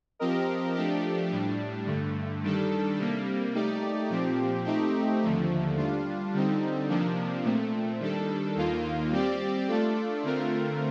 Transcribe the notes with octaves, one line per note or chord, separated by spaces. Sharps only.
F3 C4 G4 A#4 D#5
F3 A3 D4 G4
A2 G3 D4
G2 D3 A3
D#3 G3 D4 A4
C3 G3 A#3
A3 D#4 G4 D5
A#2 F3 C4 G4
A3 C4 D#4 G4
D#2 D3 F3 A3
G3 D4 F4
D3 G3 C4 D#4
C3 F3 A#3 D4
A#2 A3 C4
D#3 G3 D4 A4
D#2 D#3 A#3 F4
G3 C4 G4 D5
A3 D4 F4 A4 D5
D3 A3 C4 F4 A#4